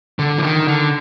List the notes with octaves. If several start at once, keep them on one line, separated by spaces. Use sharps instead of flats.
D3
F3
D#3
D3